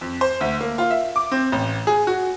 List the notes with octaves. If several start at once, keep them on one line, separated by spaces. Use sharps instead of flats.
F2
C5
D2
A#3
F4
E5
D6
C4
A1
G#4
F#4